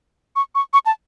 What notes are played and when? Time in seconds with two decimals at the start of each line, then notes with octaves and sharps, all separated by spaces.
0.36 C#6
0.55 C#6
0.73 C#6
0.86 A5